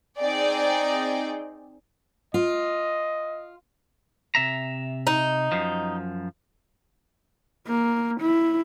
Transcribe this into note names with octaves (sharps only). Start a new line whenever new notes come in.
C4 D#4 G#4 D5 G5
F4 D#5
C3 E5 A#5
D#4
F#2 F3
A#3
E4